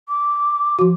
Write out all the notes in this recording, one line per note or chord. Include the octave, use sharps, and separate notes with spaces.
D6
F3 F#4